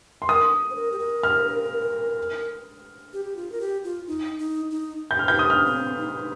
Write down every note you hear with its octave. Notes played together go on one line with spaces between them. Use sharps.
C6
A#4 D#6
C5
A#4
G4
A#4
F6
G4
G4
F4
A#4
G4
F4
D#4
D#4
D#4
G6
F6
F4 G6
D#4
D#6
F6
C4
D#4